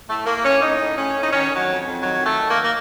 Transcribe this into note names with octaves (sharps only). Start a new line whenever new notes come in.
A2 A3
A2 A#3
A2 C#4
A2 D#4
A2
A2 C#4
A2
D#4
D#3 C#4
D#3
F#3
F2
F2
D#3 F#3
D#3
A3
D#3
A#3
A#3